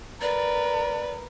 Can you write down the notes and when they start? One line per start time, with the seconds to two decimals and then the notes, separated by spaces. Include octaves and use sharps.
0.21 A#4 B4 D5